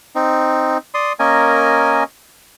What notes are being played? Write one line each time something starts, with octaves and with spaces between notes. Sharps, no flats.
C4 D#4
D5 C6 D#6
A#3 C#4 A#4 D#5 G#5